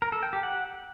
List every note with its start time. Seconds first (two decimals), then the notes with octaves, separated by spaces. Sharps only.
0.02 A#4
0.12 A4
0.23 G5
0.33 G4
0.43 F#5